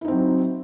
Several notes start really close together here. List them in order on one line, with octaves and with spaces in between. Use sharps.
E4 D#4 C4 F#3